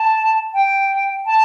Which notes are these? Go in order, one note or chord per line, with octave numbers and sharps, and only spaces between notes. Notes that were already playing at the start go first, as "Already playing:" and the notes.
Already playing: A5
G5
A5